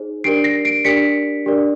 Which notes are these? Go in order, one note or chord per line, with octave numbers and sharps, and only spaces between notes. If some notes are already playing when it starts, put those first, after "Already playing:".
Already playing: D#4 G#4 C5
D4 G4 A#4 D5 C7 D7
A#6 C7
C7 D7
D4 G4 A#4 D5 B6 C#7
D4 G4 A#4 D5